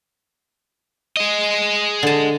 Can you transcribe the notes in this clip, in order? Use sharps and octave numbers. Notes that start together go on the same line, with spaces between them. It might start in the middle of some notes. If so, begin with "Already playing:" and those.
G#4 D#5
D3 A5